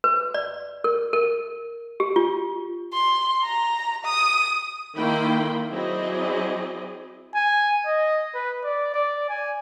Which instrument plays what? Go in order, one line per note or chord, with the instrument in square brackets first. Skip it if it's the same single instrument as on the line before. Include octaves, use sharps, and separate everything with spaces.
[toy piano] B4
D5
A#4
A#4
G4
F4
[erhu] C6
A#5
D#6
[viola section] D#3 A#3 E4 G5 B5 C6
F#3 C4 E4 G#4 D5 D#5
[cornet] G#5
D#5
B4
D5
D5
G#5